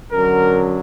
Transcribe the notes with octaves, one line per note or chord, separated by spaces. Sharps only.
F#2 D3 F#3 A#4